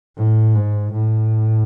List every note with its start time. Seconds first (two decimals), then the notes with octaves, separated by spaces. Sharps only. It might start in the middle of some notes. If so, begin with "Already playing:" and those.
0.17 A2
0.55 G#2
0.93 A2